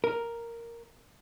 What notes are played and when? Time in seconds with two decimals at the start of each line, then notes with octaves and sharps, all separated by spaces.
0.04 A#4